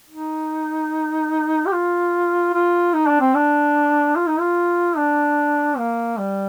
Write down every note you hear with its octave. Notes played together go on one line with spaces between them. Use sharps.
D#4
G4
F4
F4
D#4
D4
C4
D4
F4
D#4
F4
D4
A#3
G3